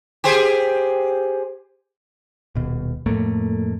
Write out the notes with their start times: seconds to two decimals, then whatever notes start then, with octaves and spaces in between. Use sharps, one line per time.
0.24 G4 G#4 C5
2.55 D#1 B2
3.06 F2 A2 A3 A#3